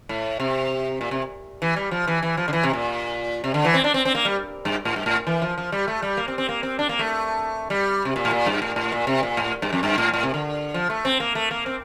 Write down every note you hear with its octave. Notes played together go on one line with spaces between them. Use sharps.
A2
C3
A#2
C3
E3
G3
F3
E3
E3
F3
D3
E3
C3
A#2
C3
D3
E3
C4
D4
C4
C4
A#3
G3
G2
A2
G2
A2
E3
F3
F3
G3
A3
G3
A#3
C4
C4
A#3
C4
D4
A#3
A3
G3
C3
A#2
A2
A#2
G2
A2
A2
A#2
C3
A#2
A2
G2
F2
G2
A2
A2
C3
D3
F3
A3
C4
A#3
A3
A#3
C4